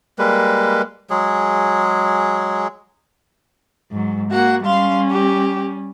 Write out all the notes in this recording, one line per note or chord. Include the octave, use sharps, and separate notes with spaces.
G3 G#3 A#3 B4
F#3 G#3 G#4
G#2 F#3
A#3 F#4 F#5
G3 C#4 F5 C6
G4